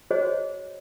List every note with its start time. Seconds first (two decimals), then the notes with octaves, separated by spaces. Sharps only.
0.11 F#4 G#4 C5 C#5 D#5